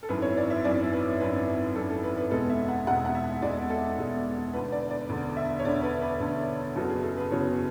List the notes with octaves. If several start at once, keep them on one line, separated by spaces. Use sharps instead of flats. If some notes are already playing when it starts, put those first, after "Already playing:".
A4
G#1 F#2 E3 B4
C#5
D5
E5
G#1 F#2 E3 D5
B4
G#1 F#2 E3 B4
G#1 F#2 E3 A4
A4
B4
B4
E1 E2 B2 G#3 A4
E5
F#5
E1 E2 B2 G#3 F#5
F#5
E5
E1 E2 B2 G#3 D5
A4
E1 E2 B2 G#3
E1 D2 D3 B4
D5
D5
E1 D2 D3
E5
C#5
E1 D2 D3 D5
B4
B4
E1 D2 D3
F#1 E2 C#3 F#3 B3 A4
G#4
A4
B4
F#1 E2 C#3 F#3 B3 C#5